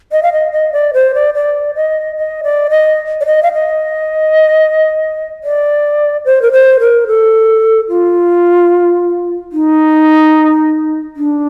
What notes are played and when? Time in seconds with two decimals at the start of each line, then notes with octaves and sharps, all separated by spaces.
0.12 D#5
0.23 F5
0.33 D#5
0.52 D#5
0.73 D5
0.94 C5
1.14 D5
1.35 D5
1.75 D#5
2.17 D#5
2.43 D5
2.70 D#5
3.21 D5
3.26 D#5
3.43 F5
3.53 D#5
5.44 D5
6.25 C5
6.42 A#4
6.52 C5
6.80 A#4
7.07 A4
7.89 F4
9.52 D#4
11.16 D4